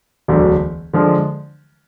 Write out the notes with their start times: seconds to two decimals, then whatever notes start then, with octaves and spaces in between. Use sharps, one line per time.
0.28 E1 D2 D3 F#3
0.93 D3 F3 G#3